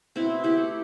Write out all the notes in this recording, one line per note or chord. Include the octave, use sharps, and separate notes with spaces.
B2 C4 E4
E4 G4
A3